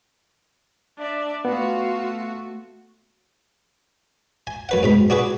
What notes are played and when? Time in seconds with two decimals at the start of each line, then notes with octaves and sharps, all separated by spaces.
0.97 D4 D5 E5
1.45 A3 B3 F4 F#4
4.47 G#5
4.69 F#2 B4 F#5
4.83 G#2 B2 B5
5.10 D4 F#4 G#4 B4